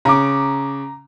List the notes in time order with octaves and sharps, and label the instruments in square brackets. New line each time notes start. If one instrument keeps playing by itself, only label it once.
[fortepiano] C#3 [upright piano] A#5 D6